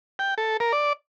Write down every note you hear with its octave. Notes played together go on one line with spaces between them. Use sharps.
G5
A4
A#4
D5